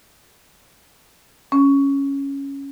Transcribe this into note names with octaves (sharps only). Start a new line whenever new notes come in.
C#4